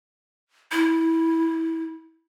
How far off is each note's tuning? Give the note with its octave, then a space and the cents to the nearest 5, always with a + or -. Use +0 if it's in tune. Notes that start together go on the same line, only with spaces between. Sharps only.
E4 -15